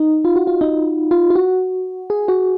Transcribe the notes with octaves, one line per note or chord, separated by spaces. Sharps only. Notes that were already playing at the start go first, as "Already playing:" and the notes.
Already playing: D#4
F4
F#4
F4
D#4
F4
F4
F#4
G#4
F#4